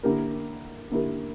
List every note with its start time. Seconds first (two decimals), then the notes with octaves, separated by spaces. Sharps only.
0.03 D3 A#3 E4 G4 A#4
0.91 D3 A#3 E4 G4 A#4